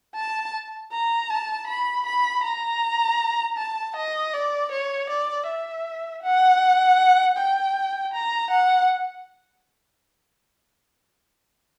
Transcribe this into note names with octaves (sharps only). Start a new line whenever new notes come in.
A5
A#5
A5
B5
B5
A#5
A5
D#5
D5
C#5
D5
E5
F#5
G5
A#5
F#5